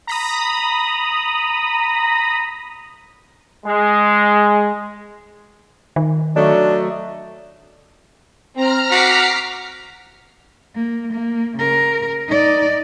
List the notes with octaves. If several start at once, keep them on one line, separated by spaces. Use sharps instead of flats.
A#5 B5 D#6
G#3
D#3
F#3 A3 D4 D#5
C4 A#5 F6
F#4 D6 B6 C7
A#3
A#3
C#3 A#4
D#4 D5